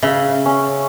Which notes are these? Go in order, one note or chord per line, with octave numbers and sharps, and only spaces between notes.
C#3 E5 F5
C#4